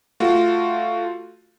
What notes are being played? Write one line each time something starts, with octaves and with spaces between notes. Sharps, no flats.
A3 F4 F#4